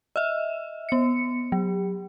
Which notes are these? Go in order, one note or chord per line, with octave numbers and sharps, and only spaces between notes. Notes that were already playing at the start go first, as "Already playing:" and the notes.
D#5 E5
B3 C#7
F#3